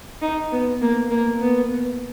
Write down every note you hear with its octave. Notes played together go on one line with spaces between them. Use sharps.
D#4
B3
A#3
A#3
B3